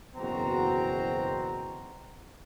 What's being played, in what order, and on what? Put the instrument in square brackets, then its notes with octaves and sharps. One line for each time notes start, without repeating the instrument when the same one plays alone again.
[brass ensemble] F#1 E2 B2 C4 F#4 A#5